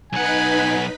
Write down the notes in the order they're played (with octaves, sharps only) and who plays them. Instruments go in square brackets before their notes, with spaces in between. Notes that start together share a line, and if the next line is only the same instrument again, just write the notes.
[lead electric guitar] B1 F#5 [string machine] D#4 B4 B5 [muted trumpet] G#5